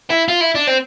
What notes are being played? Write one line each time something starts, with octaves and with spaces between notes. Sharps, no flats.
E4
F4
E4
D4
C4